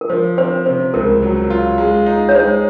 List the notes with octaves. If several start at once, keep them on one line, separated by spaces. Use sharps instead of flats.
A#4
F3 C5
C4 C5
C3 C5
C#2 A#4
F#3
F4
G#3
D#4
C#5
G#3 C5